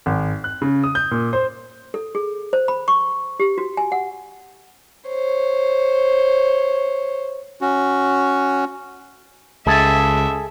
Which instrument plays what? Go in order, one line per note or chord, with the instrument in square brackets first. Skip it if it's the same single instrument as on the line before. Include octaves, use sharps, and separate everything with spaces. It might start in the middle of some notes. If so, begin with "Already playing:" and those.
[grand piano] G#1
F#6
C#3
D#6
G6
A#2
C5
[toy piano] A4
G#4
C5
B5
C#6
G4
F#4
G#5
F#5
[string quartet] C5 C#5
[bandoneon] C#4 F#4
[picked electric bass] C#2 [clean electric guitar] G#4 A4 [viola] E5